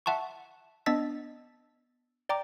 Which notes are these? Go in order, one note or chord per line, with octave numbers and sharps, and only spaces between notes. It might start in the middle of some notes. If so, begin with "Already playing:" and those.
E5 F#5 A5 C6 C#6
B3 D4 D#5 E6 A6 B6
D5 G5 A#5 D6